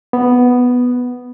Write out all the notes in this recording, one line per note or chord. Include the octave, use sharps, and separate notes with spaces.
B3